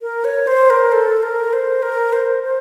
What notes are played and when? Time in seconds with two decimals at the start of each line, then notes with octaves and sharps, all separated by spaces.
0.02 A#4
0.25 C#5
0.47 C5
0.70 A#4
0.92 A4
1.23 A#4
1.53 C5
1.83 A#4
2.13 C5
2.43 C5